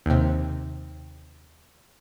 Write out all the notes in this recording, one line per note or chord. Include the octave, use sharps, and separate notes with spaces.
D#2 C3